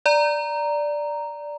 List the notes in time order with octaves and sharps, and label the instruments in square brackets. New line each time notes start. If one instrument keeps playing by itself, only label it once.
[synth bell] D5 A#5